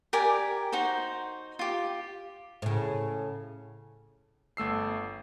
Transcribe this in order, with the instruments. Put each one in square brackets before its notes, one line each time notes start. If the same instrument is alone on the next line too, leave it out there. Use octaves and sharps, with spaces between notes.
[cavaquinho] G4 A#4 D5 G#5
D#4 F#4 C5
F4 G4
[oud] A2 C#3
[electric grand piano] G1 A3 E6 C7